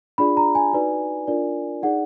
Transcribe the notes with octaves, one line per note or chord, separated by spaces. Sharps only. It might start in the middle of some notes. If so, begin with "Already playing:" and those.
D4 F4 G#4 D5 B5
A#5
G#5
D#4 F#4 B4 D5
D4 F4 A#4 D5
D#4 G#4 D5 F#5